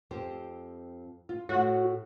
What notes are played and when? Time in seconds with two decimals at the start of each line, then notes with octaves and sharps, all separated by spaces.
0.11 F2 C4 G4
1.29 F4
1.49 A2 F#4 F#5